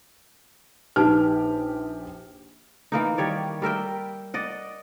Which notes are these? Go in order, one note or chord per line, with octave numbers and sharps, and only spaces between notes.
A#1 D#4 G4 B4 A5 F6
E3 A#3 D#4
D#3 G3 C#5 D5
G3 A#4 E5 G5
D5 D#5 F#5